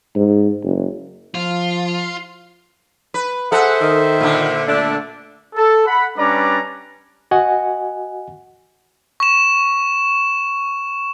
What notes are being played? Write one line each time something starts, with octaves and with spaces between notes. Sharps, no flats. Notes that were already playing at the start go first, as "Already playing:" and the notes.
G#2
F#1
F3 F4
B4
G#4 A4 C5 E5 F#5
D#3
A#2 D3
A3 D4
A4
F#5 B5
G3 C#4 D4 B4 D5 A#5
F#4 D#5 F#5 G#5
C#6 E7